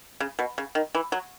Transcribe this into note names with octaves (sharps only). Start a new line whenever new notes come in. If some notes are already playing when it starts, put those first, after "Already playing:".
C#3
B2
C#3
D#3
E3
F#3